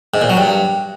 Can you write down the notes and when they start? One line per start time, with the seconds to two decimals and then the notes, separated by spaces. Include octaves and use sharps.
0.14 G#2
0.22 A#2
0.29 F#3
0.37 G2